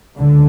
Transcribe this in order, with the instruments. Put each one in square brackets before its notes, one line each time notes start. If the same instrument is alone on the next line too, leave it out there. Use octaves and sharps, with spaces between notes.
[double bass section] C#2 D3